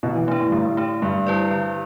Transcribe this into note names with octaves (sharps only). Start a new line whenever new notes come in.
B2 D3
E3
E3 A3 D4
A2
G2 D3
A2
A3 D4
G2 D3
G3 E4 B4 D5
D3